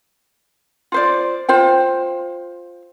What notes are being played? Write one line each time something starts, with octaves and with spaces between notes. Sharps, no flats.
F4 C5 D5
F4 C5 G5